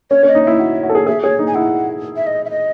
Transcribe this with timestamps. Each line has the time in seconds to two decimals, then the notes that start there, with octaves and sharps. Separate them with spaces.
0.11 C#4 C#5
0.23 C#4 D#5
0.35 D#4
0.44 E4 E5
0.59 F#4
0.83 F#4
0.90 A4
0.95 G#4
1.07 G#4 E5
1.23 G#4 C#5
1.39 D#4
1.47 G#5
1.55 E4 F#5
2.17 E5
2.27 D#5
2.45 E5
2.51 D#5